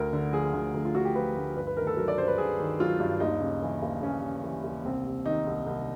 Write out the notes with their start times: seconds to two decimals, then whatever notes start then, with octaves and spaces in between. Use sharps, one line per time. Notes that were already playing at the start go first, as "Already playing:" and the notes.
Already playing: D2 A#4
0.13 D3
0.33 F3 G#4
0.54 D2
0.74 D2
0.85 F4
0.95 D3 F#4
1.05 G4
1.15 F3 B4
1.36 D2
1.56 G2 B4
1.67 B4
1.77 D#3 A#4
1.87 A4
1.97 F#3 A#4
2.08 D5
2.17 G2 C5
2.28 B4
2.38 G2 G#4
2.60 D#3
2.80 F#3 F4
3.00 G2
3.20 D#2 D#4
3.41 C#3
3.62 E3
3.82 D#2
4.02 D#2 C#4
4.24 C#3
4.44 E3
4.64 D#2
4.85 C2 C4
5.05 C3
5.26 D#3 D#4
5.47 C2
5.66 C2